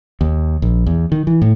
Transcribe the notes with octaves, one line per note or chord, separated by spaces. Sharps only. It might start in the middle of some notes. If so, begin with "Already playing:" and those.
D#2
A#1
E2
D#3
E3
A2